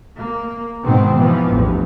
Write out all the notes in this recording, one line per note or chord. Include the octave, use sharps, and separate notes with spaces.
A#3
G#2 B2 D#3 B3 C4
B2 E3 F3 B3
A1 E2 G2